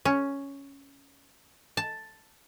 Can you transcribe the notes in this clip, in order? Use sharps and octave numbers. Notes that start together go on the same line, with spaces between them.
C#4
A5